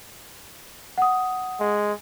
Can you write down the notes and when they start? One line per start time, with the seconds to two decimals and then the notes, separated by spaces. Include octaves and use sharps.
0.98 F#5 D#6
1.60 G#3